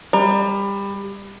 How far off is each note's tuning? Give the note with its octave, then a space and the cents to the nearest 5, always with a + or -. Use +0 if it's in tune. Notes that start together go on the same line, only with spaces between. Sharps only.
G3 +25 A#5 +0